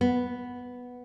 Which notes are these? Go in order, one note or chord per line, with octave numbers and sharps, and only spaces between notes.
B3